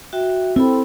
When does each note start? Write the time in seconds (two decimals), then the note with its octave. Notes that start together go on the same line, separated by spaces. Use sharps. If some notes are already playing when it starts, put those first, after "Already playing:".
0.13 F#4 E5 G5
0.56 C4 E4 A4 B5